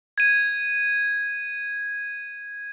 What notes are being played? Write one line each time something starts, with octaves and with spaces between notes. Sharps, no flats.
G#6 D#7